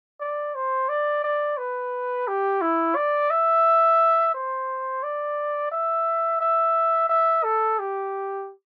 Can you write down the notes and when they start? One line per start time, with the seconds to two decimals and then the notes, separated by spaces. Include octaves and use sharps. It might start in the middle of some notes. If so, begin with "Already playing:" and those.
0.20 D5
0.55 C5
0.89 D5
1.24 D5
1.57 B4
2.27 G4
2.61 E4
2.96 D5
3.30 E5
4.34 C5
5.03 D5
5.72 E5
6.41 E5
7.09 E5
7.44 A4
7.79 G4